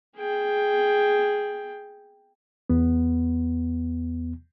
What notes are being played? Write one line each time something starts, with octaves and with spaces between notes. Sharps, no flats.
G#4 G5
E2 B3